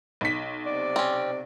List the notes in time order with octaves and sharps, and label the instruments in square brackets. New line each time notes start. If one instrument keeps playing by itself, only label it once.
[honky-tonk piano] B1 B6
[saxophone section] C3 D5
[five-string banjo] C4 C#4